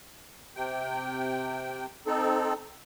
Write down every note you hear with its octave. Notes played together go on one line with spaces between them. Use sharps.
C3 G5
C4 D#4 A4